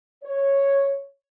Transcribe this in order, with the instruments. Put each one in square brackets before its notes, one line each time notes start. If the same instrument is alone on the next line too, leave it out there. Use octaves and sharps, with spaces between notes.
[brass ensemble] C#5